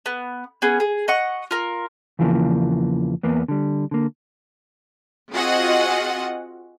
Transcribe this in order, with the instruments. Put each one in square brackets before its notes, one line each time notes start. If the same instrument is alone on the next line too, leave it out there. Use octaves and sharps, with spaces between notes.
[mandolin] B3
B3 C#4 G#4
G#4
D#5 F#5 C#6
F4 A#4
[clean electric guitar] E2 C#3 E3 F3 A3 A#3
E2 A#3 B3
D3 G3
D3 A#3
[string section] C4 F4 F#4 G#4 D#5 F#5